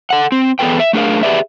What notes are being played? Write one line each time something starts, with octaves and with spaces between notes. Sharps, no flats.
A4 F#5
C4
E3 B3 G#4 A4 B4 G5
E5
A3 D4 G#4 A#4 F5
G4 G#4 B4 D5 E5